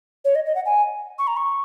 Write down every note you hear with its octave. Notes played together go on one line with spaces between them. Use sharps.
C#5
D#5
D#5
F#5
G#5
C#6
A#5
C#6